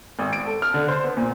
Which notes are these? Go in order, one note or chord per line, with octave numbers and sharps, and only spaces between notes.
G#1
D7
A4
F6
D3
C5
B3
A#2